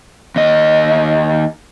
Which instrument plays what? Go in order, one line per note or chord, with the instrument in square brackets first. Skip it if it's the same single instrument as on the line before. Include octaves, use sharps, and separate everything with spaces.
[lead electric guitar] D#2 D#5